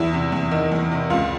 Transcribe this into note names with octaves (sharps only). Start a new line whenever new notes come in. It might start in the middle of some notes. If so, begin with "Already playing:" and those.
Already playing: E2 E4
C3
E2
D#3
E2
C3
C#2 F4